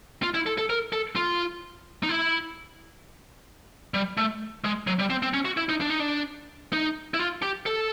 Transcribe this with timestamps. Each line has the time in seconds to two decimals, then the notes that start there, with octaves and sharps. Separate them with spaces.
0.23 F4
0.34 E4
0.46 A4
0.58 A4
0.70 A#4
0.92 A4
1.16 F4
2.03 D#4
2.09 E4
3.94 G3
4.17 A3
4.64 G#3
4.87 F#3
4.99 G3
5.10 C4
5.23 C4
5.34 C#4
5.45 F#4
5.57 E4
5.69 D#4
5.81 D4
5.90 D#4
6.00 D4
6.73 D#4
7.14 E4
7.19 F4
7.42 G4
7.66 A4